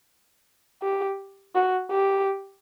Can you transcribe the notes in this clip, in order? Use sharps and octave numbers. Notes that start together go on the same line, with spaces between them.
G4
F#4
G4